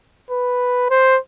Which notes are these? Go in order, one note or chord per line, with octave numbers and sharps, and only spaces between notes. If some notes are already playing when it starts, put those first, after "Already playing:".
B4
C5